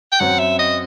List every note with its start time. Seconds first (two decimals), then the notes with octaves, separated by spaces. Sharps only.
0.12 G5
0.20 F#2 F#3 C4 F#5
0.39 E5
0.59 D#5